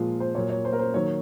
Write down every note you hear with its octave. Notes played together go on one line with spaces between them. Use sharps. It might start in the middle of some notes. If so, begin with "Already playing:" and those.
Already playing: A#2 F3 G#3 F4
C5
A#2 F#3 A#3 C#5
C#5
C5
A#4
C5
D#3 F#3 A#3 C#5